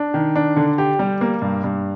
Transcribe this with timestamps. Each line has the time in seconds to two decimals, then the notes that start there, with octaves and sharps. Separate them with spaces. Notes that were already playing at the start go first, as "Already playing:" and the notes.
Already playing: D4
0.14 D#3
0.36 D4
0.56 D3
0.78 G4
0.99 G3
1.21 A#3
1.42 G2
1.64 G2